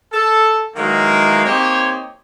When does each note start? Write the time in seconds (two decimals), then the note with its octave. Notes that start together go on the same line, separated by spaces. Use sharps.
0.12 A4
0.76 D#3 E3 F#3 G#3 A#3
1.45 A#3 C4 D#4 G4 C5 C#5